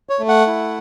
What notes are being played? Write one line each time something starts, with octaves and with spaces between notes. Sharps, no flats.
C#5
A3
F#5
E4